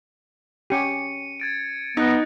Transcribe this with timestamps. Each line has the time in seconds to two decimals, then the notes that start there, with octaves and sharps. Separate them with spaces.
0.70 C#4 G4 C#7 D#7
1.40 G#6 A6 D7
1.97 B3 D#4 D#6 F#6